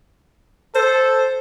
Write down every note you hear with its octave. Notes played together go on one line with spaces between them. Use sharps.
A4 C5